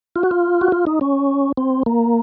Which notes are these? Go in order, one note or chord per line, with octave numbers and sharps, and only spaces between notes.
F4
F#4
F4
F#4
F4
D#4
C#4
C4
A#3